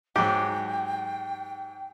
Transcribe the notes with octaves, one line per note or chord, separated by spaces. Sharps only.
G#2 F#3 G4 G5